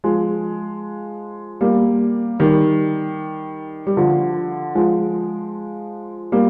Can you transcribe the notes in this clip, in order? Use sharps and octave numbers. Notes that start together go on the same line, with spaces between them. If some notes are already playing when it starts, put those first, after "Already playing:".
F3 G#3
G3 A#3
D#3 G3
G3
D3 F3
F3 G#3
G3 A#3